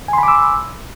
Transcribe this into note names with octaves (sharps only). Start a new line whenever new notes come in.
G#5 B5 C6 D6 E6